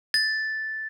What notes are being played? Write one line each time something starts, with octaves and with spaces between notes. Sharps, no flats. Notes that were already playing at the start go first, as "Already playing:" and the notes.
A6